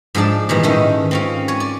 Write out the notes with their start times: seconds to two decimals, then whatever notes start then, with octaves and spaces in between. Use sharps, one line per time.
0.15 G#2 F3 D4 G#4 D5 A5
0.49 A#2 D#3 E3 G3
0.63 G#2 D#3 C#4 D#4 E4 A4
1.11 C4 C#4 F4
1.48 C#5 G#5
1.60 D5